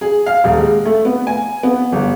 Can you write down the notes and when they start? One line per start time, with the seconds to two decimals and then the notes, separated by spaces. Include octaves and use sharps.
0.01 G#4
0.26 F5
0.44 D#1
0.58 G#3
0.85 A3
1.05 B3
1.27 G#5
1.63 B3
1.92 G1